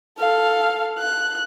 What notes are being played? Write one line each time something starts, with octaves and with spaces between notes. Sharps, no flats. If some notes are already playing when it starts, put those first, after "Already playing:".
A4 F5
F#6